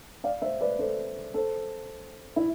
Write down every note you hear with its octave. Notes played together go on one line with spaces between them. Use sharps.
D5 F5
C5 E5
B4 D5
A4 C5
A4 C5
E4